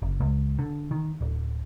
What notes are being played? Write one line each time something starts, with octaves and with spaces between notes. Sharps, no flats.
F#1
C#2
D3
D#3
D1